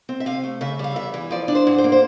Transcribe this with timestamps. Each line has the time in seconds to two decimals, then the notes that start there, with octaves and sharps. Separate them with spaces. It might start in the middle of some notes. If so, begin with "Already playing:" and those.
0.09 C4
0.20 E5
0.26 C3 F5
0.44 A3
0.61 C#3 E5
0.79 G3 F5
0.96 E2 E5
1.14 E3
1.31 F3 D5
1.48 D4
1.55 C5
1.67 G#2
1.78 C5
1.84 A#3
1.92 C5